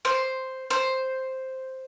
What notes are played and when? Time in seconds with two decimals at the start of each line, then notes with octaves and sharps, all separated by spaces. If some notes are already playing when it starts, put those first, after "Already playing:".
0.05 C5
0.70 C5